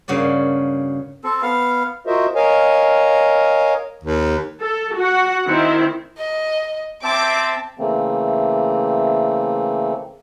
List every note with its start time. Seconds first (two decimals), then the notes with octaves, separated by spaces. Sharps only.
0.08 G2 C#3 A#3 F#4 D5
1.24 C4 A4
1.42 B3 F5
2.07 F4 F#4 A#4 C5 D#5 E5
2.36 A#4 C#5 D#5 F5 G#5
4.04 D#2
4.61 A4
4.97 F#4 F#5
5.46 D#3 C4 E4
6.18 D#5
7.04 C4 E5 A5 D6
7.79 C#3 E3 A3 A#3 C4